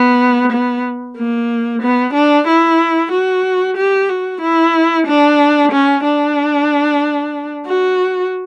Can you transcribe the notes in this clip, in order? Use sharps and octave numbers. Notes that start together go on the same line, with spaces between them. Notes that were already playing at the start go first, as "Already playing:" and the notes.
Already playing: B3
B3
A#3
B3
D4
E4
F#4
G4
F#4
E4
D4
C#4
D4
F#4